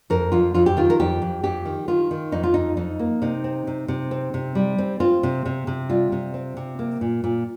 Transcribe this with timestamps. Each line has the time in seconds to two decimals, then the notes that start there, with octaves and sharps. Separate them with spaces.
0.10 F2 A#4
0.32 F2 F4
0.54 F2 F4
0.66 G4
0.77 D#3 F4
0.90 A#4
1.00 F2 G4
1.22 F2
1.44 F2 G4
1.65 D#3
1.88 D#3 F4
2.11 D#3
2.32 F2 D#4
2.43 F4
2.54 F2 D#4
2.77 F2 D#4
2.99 A#3
3.22 C3 D#4
3.44 C4
3.67 C3
3.88 C3
4.11 C4
4.34 C3
4.55 G3
4.78 C4
5.00 C4 F4
5.23 C3
5.46 C3
5.67 C3
5.89 G3 F4
6.12 C3
6.34 C4
6.57 C3
6.79 A#3
7.01 A#2
7.24 A#2